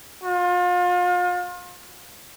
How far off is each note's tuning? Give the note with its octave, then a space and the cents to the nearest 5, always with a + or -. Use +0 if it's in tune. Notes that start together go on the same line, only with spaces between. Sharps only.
F4 +35